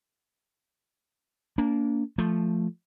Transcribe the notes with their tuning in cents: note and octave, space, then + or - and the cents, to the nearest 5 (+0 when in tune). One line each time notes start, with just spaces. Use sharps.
A#3 -5 D4 -35
F3 +0 A3 +0